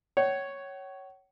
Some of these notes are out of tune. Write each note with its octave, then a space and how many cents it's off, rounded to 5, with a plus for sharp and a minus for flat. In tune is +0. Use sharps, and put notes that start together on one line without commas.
C#5 +0 F#5 +45